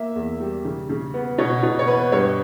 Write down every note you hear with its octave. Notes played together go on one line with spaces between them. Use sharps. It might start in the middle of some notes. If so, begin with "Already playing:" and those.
Already playing: A#3 E5
E2
G3
C#3
C#3
B3
B2 C#5
B2
C#5
B3 B4
G2 C#5